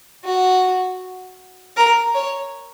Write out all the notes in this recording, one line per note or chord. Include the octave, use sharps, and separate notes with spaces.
F#4
A#4
C#5